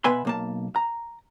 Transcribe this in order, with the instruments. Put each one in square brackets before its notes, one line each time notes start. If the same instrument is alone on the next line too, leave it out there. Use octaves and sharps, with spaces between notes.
[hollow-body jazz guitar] B2 B3 B4 E5 G#5 C6
B1 A#3 A5
A#5